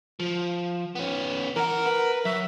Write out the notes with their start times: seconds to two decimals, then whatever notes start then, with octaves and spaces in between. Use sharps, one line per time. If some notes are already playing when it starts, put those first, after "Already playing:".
0.20 F3
0.95 B3 C#4
1.56 E3 A#4 F#5
1.86 B4
2.25 F#3 E5